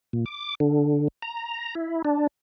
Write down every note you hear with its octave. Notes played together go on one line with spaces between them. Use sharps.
A#2
D6
D3
A#5
E4
D4